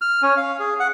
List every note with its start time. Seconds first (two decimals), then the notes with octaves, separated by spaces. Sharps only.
0.02 F6
0.22 C#4
0.37 F5
0.59 G#4
0.80 F#5